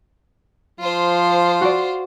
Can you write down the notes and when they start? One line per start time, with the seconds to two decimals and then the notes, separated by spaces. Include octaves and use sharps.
0.80 F3 F4 C5
1.61 F#4 D5